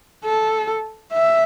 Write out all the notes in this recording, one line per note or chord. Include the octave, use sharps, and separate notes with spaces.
A4
E5